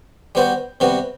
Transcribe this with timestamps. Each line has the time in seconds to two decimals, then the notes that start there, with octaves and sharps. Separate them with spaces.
0.35 G3 B3 F#4 C5
0.80 C3 G3 B3 F#4